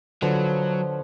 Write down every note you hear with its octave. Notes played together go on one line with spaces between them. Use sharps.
D3 F3 F#3 B4 C#5